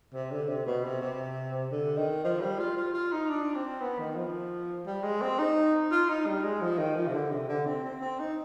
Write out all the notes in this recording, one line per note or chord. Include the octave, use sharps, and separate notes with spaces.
C3
D3
C3
B2
C3
C3
D3
D#3
F3
G3
F4
F4
F4
D#4
D4
C4
B3
D#3
F3
G3
G#3
C4
D#4
F4
D#4
G3
G#3
F3
D#3
F3
C3
D3
C3
D3
C4
C4
C4
D#4